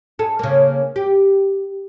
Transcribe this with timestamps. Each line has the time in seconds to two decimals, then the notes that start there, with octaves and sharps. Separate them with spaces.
0.19 G#4 A4
0.39 C#3 A#3
0.96 G4